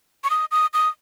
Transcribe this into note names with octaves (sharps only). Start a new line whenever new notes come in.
C#6
D#6
D#6
D#6